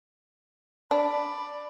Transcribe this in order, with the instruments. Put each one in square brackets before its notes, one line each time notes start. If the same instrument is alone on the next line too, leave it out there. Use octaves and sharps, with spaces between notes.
[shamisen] D4 [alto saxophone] D5 [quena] B5